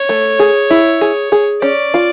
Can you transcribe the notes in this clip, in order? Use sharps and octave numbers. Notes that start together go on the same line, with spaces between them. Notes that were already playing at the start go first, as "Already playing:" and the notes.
Already playing: C#5
A3
G#4
E4
G#4
G#4
C#4 D5
F4